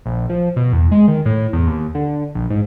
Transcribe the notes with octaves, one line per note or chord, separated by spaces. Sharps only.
A#1
F3
B2
E2
G#3
D#3
A2
E2
D#2
D3
A#1
G#2